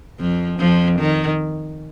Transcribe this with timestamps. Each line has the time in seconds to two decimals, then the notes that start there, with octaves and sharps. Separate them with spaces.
0.19 F2 F3
0.60 F2 F3
0.99 D#3